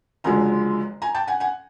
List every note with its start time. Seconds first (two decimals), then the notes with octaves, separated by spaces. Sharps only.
0.24 F#1 F#2 D3 F3 G#3 G#5 A#5
1.02 G#5 A#5
1.15 G5 A5
1.27 F#5 G#5
1.40 F#5 G#5